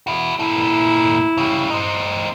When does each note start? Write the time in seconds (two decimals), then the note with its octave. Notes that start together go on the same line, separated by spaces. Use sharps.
0.07 E4 F#4
0.39 A#2 A3 E4
1.37 C#3 G3
1.70 C4 D#4